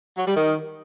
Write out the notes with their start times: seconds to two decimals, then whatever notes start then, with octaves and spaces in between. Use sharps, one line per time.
0.17 F#3
0.26 G3
0.35 D#3